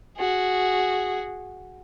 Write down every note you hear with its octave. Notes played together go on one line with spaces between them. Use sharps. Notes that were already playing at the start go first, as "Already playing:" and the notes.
F#4 G#4